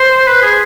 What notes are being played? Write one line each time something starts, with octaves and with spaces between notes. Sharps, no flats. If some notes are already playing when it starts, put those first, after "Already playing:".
Already playing: C5
B4
G#4